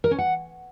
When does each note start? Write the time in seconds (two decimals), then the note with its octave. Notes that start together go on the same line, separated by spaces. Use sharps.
0.04 A#4
0.11 C#4
0.18 F#5